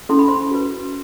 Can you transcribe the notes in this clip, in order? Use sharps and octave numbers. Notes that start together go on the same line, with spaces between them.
C#4 E4 A4 C6
B5
C5 C6
F#4 B4